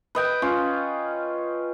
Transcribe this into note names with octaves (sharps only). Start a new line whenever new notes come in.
B4 D#5 G5
C#4 F4